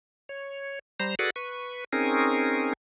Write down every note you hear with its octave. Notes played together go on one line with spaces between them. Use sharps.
C#5
G3 C5 A#5
F#4 G#4 A4 B4 D5 F#5
B4 C#6
C4 C#4 D#4 G#4 A#4